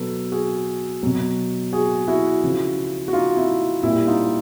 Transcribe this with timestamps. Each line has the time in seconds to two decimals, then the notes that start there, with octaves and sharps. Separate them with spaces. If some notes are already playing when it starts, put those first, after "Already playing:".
Already playing: B2 F#3 A4 B4
0.32 F#4 G#4
1.03 B2 F#3
1.73 F#4 G#4
2.08 E4 F#4
2.43 C#3 F3
3.08 F#4
3.13 D#4 F4
3.37 E4
3.83 A#2 G3 E4
4.07 D#4 F4